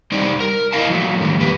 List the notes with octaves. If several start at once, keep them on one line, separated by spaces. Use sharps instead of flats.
G3 D#4 C5 D5
A#4
E4 D#5 F5 A5
F3 F#3 A3
A2 D3 D#3 F#3 G3
F2 A#3 G4 B4